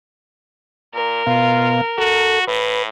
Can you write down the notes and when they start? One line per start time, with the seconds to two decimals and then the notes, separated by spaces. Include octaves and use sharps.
0.94 A#2 A#4
1.27 B2 F4 F5
1.98 F#4 A4
2.48 A2 B4